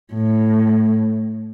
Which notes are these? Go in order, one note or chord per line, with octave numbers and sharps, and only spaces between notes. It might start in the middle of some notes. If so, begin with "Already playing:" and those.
A2